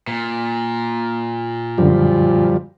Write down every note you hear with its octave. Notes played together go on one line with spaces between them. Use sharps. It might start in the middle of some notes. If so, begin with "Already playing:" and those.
A#2
F#2 D3 F3 G3